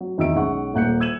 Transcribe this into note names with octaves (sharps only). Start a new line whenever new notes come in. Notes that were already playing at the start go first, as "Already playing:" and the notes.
F#3
E2 D#3 E5 E6 D7
B1 G#3 C#4 F#5 C#6
D#1 A#3 F#5 F#6 G6 C#7
E6 G#6 D#7 E7 F#7